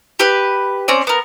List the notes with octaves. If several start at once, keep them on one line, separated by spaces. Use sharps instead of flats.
G4 B4
C4 C#4 D5
B3 A#4